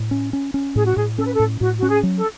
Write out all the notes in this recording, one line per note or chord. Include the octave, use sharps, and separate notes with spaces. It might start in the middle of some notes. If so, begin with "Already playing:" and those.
Already playing: A2
C#4
C#4
C#4
A2 G#4
F#4
A2 G#4
C#4 A4
B4
A4
A2
A2 F#4
C#4 F#4
G#4
F#3
A4